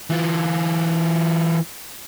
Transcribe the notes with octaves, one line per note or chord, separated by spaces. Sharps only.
E3 F4